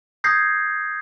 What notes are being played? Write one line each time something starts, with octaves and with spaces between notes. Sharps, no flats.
D#6 G6 G#6 A#6 C7